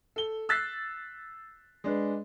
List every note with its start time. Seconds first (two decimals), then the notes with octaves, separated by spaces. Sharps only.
0.16 A4 G7
0.49 E6 F#6 A6 B6 C7
1.84 G#3 D4 B4